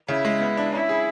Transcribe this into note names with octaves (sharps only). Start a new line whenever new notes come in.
C#3 E4
G#3
B3
D4
C#4 E4
G#4